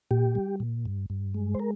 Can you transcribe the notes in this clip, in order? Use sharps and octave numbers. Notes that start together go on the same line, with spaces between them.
A#2 G4
G3
A#2
G2
G2
G#3
C5
A#4